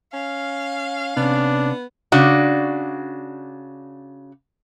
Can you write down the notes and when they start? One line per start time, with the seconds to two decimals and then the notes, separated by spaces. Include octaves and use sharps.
0.13 C#4 F5
1.17 C3 B3 C#4 D4
2.12 C#3 D4 F#4